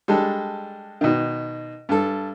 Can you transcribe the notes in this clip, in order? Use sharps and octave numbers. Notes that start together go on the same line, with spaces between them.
G3 G#3 D4 A4
B2 D#3
G2 A4